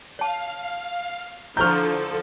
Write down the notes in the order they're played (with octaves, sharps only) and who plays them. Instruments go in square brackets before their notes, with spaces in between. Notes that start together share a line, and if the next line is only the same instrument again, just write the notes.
[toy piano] C#5 A5 [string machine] F5
[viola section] D3 F3 [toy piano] E4 A#5 C#6 [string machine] A4 [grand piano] F6 G6